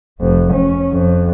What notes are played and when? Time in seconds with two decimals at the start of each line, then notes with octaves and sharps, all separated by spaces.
0.21 F1 F2
0.54 C#4
0.92 F2